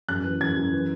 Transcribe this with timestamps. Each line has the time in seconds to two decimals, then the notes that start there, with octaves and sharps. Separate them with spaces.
0.09 F#2 F#6
0.24 E3
0.41 F#2 G#6
0.57 F#2
0.73 E3